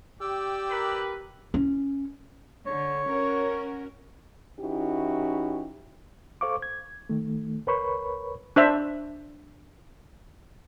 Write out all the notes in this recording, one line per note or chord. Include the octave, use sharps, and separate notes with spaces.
G4 D5 G5 E6
A#4 B4
C#4
D3 C#5
C#4 F#4 A#4
E3 C#4 D#4 E4 F#4 G4
A4 C5 F5 C#6 D6
G#6
D#3 A3
C#2 A#4 B4 C#5 B5 C#6
D4 C5 E5